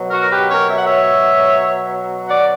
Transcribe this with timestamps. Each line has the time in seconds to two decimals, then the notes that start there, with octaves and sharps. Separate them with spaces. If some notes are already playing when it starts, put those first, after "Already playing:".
Already playing: B2 F#3
0.10 F#4 A#4
0.21 A#4
0.29 G4 B4
0.50 A#4 C#5
0.70 E5
0.77 F#5
0.85 C#5 E5
2.27 D5 F#5